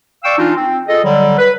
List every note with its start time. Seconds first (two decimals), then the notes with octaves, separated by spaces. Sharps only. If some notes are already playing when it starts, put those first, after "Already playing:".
0.24 D5 F5 G5 C#6 E6
0.38 E3 D4 D#4 F4
0.56 C4
0.88 F4 G#4 A4 D#5
1.04 D3 F#3 G3
1.38 B4